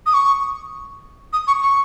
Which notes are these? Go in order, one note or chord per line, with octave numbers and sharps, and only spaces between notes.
D#6
C#6
D#6
C#6
C#6